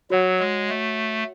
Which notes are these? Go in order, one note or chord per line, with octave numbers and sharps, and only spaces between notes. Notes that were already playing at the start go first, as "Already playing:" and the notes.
F#3 F#4 C#5 F#5
G#3
A3